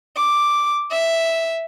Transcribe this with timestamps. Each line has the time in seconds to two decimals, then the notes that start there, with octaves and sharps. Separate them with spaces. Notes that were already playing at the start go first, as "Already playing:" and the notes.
0.17 D6
0.91 E5